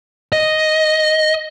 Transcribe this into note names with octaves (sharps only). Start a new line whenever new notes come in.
D#5